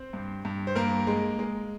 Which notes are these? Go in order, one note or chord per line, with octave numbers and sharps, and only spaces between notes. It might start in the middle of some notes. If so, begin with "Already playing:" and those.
Already playing: C4 C5
G2
G2
C5
G2 A#3 A#4
G#3
G#3